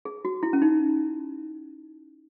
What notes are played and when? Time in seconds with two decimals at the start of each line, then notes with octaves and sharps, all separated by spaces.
0.05 G#4
0.25 F#4
0.43 E4
0.53 C#4
0.62 D#4